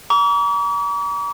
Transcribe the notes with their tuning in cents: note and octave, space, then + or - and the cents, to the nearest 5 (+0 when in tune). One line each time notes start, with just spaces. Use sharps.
A#5 +25 D6 -45